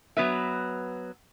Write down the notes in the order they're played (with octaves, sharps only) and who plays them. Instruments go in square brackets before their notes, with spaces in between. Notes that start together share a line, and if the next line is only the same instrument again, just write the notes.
[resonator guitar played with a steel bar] F#3 B3 B4 E5